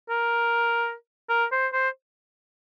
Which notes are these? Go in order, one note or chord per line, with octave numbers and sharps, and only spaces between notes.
A#4
A#4
C5
C5